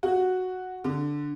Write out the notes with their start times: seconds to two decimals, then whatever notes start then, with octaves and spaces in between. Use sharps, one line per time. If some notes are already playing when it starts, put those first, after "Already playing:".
0.03 F#4
0.84 D3